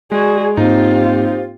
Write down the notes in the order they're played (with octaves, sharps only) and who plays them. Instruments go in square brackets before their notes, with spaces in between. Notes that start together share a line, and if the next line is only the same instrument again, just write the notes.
[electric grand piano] G#3 [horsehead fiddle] F#4 G#4 [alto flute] D5
[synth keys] G#2 A#3 C4 [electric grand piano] D#4 [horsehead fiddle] F4 G4 [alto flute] C5